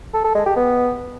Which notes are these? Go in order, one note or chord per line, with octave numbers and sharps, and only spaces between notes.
A4
A4
G#3
G4
B3